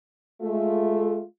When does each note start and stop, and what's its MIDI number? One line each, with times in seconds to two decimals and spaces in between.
0.42 1.22 56
0.42 1.22 57
0.42 1.22 65